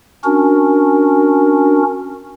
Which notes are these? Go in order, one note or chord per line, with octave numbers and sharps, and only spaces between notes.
C#4 D4 F#4 A#4